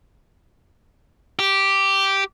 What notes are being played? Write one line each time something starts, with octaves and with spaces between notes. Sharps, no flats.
G4